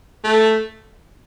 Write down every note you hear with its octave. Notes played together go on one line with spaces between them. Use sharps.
A3